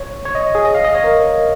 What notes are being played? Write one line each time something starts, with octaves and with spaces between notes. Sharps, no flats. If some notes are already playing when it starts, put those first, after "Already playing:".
Already playing: C#5
C#5
D#5
G#4
D#5
F5
D#5
C#5
A#4